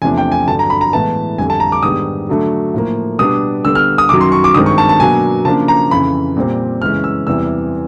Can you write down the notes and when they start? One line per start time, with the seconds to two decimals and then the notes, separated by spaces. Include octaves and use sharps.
0.02 E2 C3 F3 A3 D4 G#5
0.18 G5
0.32 G#5
0.47 G2 D3 F#3 A5
0.59 A#5
0.70 B5
0.81 A#5
0.93 A2 E3 G#3 B3 A5
1.38 F2 D3 G3 G#5
1.50 A5
1.60 A#5
1.72 D6
1.83 G#2 D#3 G3 B3 D4 D#6
2.29 D3 F#3 A3 D4
2.74 A2 F3 A#3
3.18 B2 G3 B3 D4 D#6
3.65 D3 G3 B3 E6
3.75 F6
3.98 D#6
4.09 F#2 D#3 F#3 D6
4.21 C6
4.32 C#6
4.44 D6
4.54 G2 D#3 G#3 C4 D#6
4.66 C#6
4.78 A5
4.89 A5
5.00 B2 F#3 A#3 D4 G#5
5.45 C#3 F3 A#3 D4 A5
5.68 A#5
5.91 F2 C#3 E3 B5
6.36 A#2 G3 C4
6.81 F#2 C#3 E3 G#3 C#4 F6
7.04 E6
7.27 E2 C3 E3 G3 E6